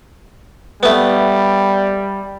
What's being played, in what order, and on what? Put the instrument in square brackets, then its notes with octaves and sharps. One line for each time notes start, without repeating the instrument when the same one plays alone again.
[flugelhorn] G3 [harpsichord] A3 B3